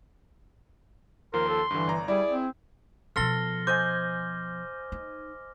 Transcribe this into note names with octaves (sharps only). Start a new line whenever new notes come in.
D#2 F3 A#4 C6
A4
G2 D3 E3
G1 D5 A#5
G3 E4 G#4 D5
C4
B2 F3 A4 C6 F6 A#6 G7
C5 D#5 G#5 D6 G6
D#4